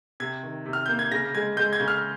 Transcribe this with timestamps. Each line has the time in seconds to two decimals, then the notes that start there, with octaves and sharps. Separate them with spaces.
0.20 C3 G#6
0.43 D#3
0.66 C3
0.73 F6
0.86 A#3 G6
0.99 G#6
1.11 C#3 A#6
1.35 G#3 G#6
1.57 G#3 G6
1.73 G#6
1.80 C#3
1.88 F6